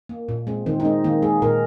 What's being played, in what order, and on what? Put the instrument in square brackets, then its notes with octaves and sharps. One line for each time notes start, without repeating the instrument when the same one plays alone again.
[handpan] A#3
A#2
G#3 C4
D#3 C4
D#4
G#3 C4
D#3 A#3
G#3 G#4
A#2 A#4